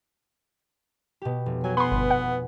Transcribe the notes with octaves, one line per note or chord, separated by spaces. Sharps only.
B2 G4
F1
F#3 G#5
B3 B5 C6
G1 B4
F#5